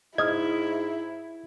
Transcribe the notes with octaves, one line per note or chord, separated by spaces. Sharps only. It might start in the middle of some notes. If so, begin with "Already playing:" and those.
G#2 E4 D#5 D#6 F6 G#6